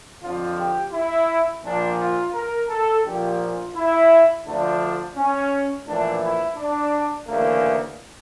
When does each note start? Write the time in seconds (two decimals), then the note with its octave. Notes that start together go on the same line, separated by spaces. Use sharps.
0.21 F2 D3 F3 F4
0.57 G4
0.93 E4
1.63 A#1 A#2 F3 D4
1.98 F4
2.33 A#4
2.69 A4
3.04 A#1 A#2 F3 G4
3.40 F4
3.75 E4
4.45 D2 D3 F3 D4
5.16 C#4
5.86 A#1 A2 E3 D4
6.22 E4
6.56 D4
7.27 D2 C#3 E3 A#3